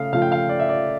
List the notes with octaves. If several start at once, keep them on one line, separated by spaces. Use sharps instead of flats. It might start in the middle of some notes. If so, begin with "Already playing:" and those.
Already playing: C#3 A3 F5
C#3 F3 A3 F5
G5
F5
D5
E5
D5